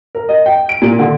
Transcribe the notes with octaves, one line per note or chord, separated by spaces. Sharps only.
A#4
D#5
G5
D7
A#2
D3